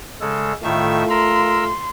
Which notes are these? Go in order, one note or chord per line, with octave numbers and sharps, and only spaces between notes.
C#3 G#3 A4
A2 D#3 A3 F4 E5
A#4 A#5 C6 E6